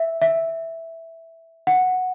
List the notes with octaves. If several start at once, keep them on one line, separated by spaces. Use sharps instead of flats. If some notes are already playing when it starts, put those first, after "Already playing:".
Already playing: E5
E5
F#5